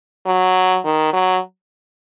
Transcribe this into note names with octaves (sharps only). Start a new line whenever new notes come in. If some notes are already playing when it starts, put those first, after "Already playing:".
F#3
D#3
F#3